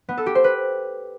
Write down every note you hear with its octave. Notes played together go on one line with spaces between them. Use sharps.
B3
A4
G4
C5
B4